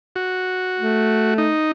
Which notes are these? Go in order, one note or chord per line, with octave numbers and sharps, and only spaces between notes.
F#4
A3
D#4